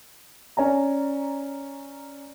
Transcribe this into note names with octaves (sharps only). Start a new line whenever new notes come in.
C#4 D5 G#5 A#5